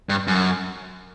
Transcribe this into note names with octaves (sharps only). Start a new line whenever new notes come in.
G2
F#2